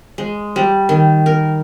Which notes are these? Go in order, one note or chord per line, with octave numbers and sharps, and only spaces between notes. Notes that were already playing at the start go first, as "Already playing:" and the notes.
G#3
G3
D#3
A#4